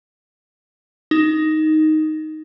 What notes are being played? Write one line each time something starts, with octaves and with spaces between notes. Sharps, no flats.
D#4